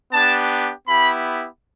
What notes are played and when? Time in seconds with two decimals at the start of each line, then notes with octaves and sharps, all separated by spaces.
0.13 B3 D4 G4 A5
0.87 B3 E4 G4 B5